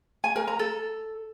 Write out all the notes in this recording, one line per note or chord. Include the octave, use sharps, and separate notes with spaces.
G#5
A#4
A#5
A4